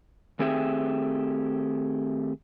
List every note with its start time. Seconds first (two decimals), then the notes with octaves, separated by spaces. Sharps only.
0.39 D#3 A3 C4 G4 G#4 E5